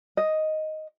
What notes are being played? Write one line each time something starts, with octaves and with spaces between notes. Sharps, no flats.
D#5